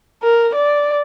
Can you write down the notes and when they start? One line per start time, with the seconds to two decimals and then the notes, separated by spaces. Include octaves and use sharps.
0.23 A#4
0.55 D5